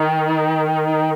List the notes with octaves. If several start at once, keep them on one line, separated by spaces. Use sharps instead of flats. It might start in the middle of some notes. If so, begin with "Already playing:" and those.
Already playing: D#3